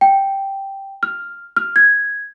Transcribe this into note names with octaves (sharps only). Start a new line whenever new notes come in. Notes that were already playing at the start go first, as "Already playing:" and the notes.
G5
F6
F6
G#6